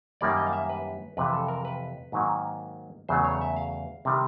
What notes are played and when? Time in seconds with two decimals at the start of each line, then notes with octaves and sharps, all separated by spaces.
0.21 F#2 D#3 G3 A#3 D5
0.37 D#5
0.47 F5
0.53 E5
0.69 B4
1.17 F2 C3 E3 B4
1.33 A4
1.48 A#4
1.65 B4
2.12 G#2 D#3 F#3 A#3
3.09 E2 C#3 F#3 A3 C5
3.24 C#5
3.41 E5
3.56 F5
4.05 C3 D#3 G3